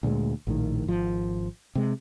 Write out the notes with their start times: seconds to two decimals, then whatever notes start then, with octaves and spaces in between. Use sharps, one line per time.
0.03 D2 A#2 G3 G#3
0.47 A#1 A2 D#3
0.87 G#1 F3
1.75 C3 G#3